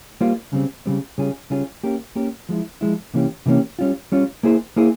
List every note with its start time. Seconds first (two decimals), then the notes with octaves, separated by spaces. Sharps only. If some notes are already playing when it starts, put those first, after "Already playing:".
0.21 G3 A#3 F4 C5
0.53 C#3 G3 C4
0.86 C#3 G3 C4
1.18 C#3 G3 C#4 F4 G#4
1.50 C#3 G3 C#4 F4 G#4
1.83 A#3 C#4 G4 A#4
2.15 A#3 C#4 G4 A#4
2.49 F3 G#3 E4
2.81 F3 G#3 E4
3.14 C3 E3 A#3 C#4 G4
3.46 C3 E3 A#3 C#4 G4
3.79 G3 C#4 F4
4.12 G3 C#4 F4
4.43 A#3 E4 G#4 C5
4.76 A#3 E4 G#4 C5